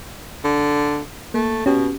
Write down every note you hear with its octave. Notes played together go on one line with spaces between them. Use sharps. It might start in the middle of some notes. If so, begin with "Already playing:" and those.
D3
A3 A#3
B2 C#4 G4